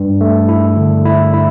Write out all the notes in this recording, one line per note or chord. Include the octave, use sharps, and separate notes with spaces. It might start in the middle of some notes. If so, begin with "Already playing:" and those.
Already playing: G2
A3
E4
D3
E4
E4